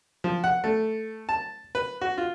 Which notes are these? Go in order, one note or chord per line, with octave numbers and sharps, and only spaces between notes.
F3
F#5
A3
A5
B4
F#4
F4